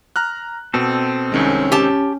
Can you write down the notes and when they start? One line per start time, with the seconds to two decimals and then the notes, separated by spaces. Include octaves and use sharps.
0.16 A#5 F6 F#6
0.74 B2 C4 A4
1.32 C2 D#3 G#3 C#4
1.72 G4 A5